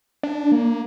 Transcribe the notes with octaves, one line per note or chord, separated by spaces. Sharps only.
D4
A#3